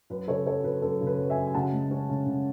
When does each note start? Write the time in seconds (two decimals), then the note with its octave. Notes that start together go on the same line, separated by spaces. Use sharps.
0.10 F#2 B4
0.28 C#3 A4 C#5
0.46 F#3 A4 C#5
0.64 F#2 B4
0.82 F#2 A4
1.01 C#3
1.07 B4
1.19 F#3
1.30 E5 G#5
1.37 F#2
1.47 G#5
1.54 C#3 F#5 A5
1.73 G#3
1.91 C#4
2.09 C#3
2.26 C#3